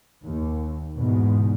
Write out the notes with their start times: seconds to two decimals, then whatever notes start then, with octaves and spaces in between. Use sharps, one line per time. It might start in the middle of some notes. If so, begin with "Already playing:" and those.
0.24 D#2
0.96 E2 G#2 B2